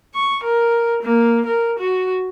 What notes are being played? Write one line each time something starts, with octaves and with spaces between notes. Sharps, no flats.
C#6
A#4
A#3
A#4
F#4